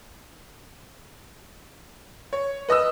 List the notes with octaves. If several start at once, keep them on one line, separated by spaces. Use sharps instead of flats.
C#5
B4 D#5 D#6 E6